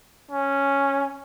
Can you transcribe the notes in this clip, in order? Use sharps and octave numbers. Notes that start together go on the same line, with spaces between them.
C#4